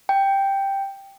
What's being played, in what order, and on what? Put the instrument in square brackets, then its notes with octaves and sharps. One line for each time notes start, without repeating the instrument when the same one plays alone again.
[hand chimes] G5